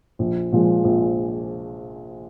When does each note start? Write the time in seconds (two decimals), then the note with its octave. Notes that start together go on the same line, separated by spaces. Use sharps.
0.19 A#1
0.52 A#2 F3 G#3
0.84 A#1